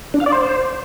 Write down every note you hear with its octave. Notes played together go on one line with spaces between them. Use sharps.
D4
F5
D5
C5